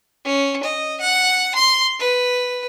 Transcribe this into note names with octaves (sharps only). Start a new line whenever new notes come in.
C#4
D#5
F#5
C6
B4